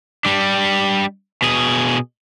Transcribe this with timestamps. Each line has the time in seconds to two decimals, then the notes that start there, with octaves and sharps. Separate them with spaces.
0.25 G3 D4
1.42 B2 G#4